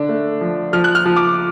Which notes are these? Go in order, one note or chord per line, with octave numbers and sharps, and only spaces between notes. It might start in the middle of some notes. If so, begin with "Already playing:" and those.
Already playing: D3 D4
A3
F3
F3 F6
F#6
F6
F3
D6